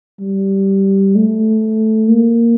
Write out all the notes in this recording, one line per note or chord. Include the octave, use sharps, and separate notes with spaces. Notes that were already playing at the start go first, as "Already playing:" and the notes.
G3
A3
A#3